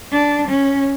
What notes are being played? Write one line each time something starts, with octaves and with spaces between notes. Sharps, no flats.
D4
C#4